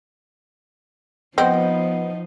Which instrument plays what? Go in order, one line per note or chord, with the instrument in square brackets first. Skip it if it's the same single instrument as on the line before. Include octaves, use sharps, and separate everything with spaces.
[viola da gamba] F3 D#4 [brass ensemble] B3 [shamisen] C4 [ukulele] D#5 F#5